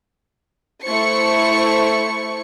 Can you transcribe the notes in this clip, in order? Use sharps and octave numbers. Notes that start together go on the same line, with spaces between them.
A3 E4 C5 C#6 C#7